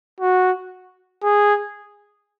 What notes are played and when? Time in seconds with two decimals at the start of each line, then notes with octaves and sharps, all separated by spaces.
0.20 F#4
1.23 G#4